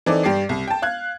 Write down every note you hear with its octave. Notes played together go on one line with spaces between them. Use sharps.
E3 C4 D#4 A4 D5
G2 G4 D5 D6 C7
C2
G5 A5
F5 F#6 G#6